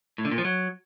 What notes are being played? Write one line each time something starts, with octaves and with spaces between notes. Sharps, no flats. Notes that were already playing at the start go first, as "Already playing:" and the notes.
A2
D3
A#2
F3
F#3